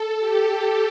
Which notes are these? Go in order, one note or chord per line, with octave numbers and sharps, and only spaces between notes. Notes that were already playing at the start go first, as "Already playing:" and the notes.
Already playing: A4
G4